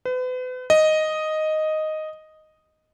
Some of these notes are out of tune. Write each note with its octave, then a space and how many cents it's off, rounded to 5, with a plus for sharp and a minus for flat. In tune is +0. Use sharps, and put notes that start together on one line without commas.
B4 +40
D#5 +0